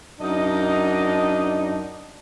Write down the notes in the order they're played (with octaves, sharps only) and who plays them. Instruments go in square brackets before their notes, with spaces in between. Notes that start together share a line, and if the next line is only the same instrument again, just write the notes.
[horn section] F#2 D4 D#4 D#5